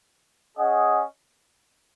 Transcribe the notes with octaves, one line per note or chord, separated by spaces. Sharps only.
C#4 G#4 D#5 F#5